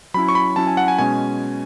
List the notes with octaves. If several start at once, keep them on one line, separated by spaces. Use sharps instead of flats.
F#3 C#4 E4 B5
C#6
B5
F#3 C#4 E4 A5
G#5
F#5
G#5
B2 G#3 C#4 G#5